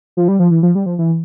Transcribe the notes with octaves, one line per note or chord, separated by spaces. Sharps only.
F3
G3
F3
E3
F3
G3
F3
E3